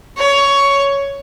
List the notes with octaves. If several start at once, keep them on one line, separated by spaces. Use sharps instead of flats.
C#5